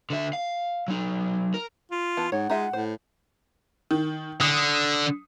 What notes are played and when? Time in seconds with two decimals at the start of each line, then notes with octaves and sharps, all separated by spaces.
0.10 D3 E5
0.33 F5
0.88 F#3 D#4
1.54 A#4
1.91 F4
2.17 E3 B3 A5
2.32 G#2 C#5 F#5
2.50 G#3 D#4 F4 E5
2.73 A2 C5
3.91 D#3
4.41 D3 D#6